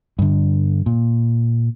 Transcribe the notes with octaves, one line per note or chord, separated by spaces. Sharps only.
G2 D3
A#2